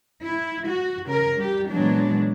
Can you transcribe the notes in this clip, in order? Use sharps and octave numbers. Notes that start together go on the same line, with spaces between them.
E4
F#4
C#3 A#4
G3 G4
A#2 E3 F#3 G#3 B3 D4